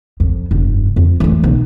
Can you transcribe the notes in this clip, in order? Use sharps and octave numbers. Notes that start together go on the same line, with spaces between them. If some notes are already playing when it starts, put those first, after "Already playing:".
F2
F1 G2
F2
E3 A3
B1